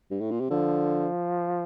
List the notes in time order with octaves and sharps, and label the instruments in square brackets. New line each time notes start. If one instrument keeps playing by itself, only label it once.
[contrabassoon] G2
A2
A#2
C3
[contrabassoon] D3 [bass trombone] F3